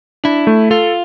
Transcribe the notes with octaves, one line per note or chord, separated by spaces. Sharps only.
D4 E4
A3
F4 A4